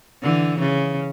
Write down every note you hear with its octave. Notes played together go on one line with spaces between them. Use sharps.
D3 E3
C#3